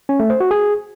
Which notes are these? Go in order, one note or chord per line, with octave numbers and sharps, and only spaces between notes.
C#4
A3
C5
F#4
G#4